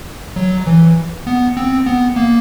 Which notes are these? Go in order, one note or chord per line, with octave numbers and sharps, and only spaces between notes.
F#3
E3
B3
C4
B3
A#3